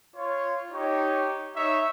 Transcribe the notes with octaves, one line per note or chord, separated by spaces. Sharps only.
F4 C#5
D#4 G4 C#5
D#4 C#5 E5